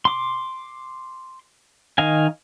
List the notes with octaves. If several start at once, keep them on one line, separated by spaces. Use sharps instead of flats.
C6 D6
D#3 D#5 F5 G#5